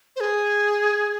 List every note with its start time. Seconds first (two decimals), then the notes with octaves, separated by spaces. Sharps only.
0.16 C5
0.20 G#4